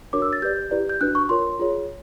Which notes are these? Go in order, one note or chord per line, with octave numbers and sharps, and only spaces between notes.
D4 F#4 A#4 C#5 D6
E6
A6
G4 B4 D5 G6
E4 G4 B4 D5
G6
D4 F#4 B4 F#6
C#6
F4 A#4 C#5 C6
F4 G#4 C#5